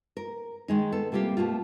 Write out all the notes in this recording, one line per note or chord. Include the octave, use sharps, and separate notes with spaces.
A#4
D#3 G#3 D#4
B3 A4
C3 G3 A#3 F4 G4
B2 A3 A#3 F4